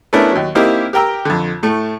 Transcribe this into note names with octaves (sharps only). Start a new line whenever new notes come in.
A3 B3 C#4 D4 E4 A#4
D#2 F#3
A#3 C4 D#4 E4 G4 A#4
G4 A#4 G5 A#5 E6
F2 D3
A2 A3